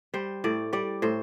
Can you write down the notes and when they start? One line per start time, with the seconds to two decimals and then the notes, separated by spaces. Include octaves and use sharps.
0.14 G3 C5
0.44 A2 D5
0.73 G3 D5
1.02 A2 C5